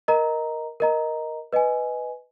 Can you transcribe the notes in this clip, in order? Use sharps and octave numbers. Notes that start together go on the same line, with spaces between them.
A#4 D#5 A#5
A#4 D#5 A#5
B4 D#5 G#5